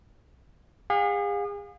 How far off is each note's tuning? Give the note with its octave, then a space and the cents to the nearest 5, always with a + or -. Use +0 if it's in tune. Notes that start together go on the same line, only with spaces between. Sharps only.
G#4 -40 F5 +40